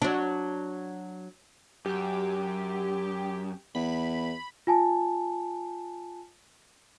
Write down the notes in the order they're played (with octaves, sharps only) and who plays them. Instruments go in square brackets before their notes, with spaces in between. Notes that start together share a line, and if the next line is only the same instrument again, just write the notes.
[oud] F#3 D4
[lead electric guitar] F#2 [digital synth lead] G4
[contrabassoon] E2 [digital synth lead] B5
[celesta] F4 G#5 A5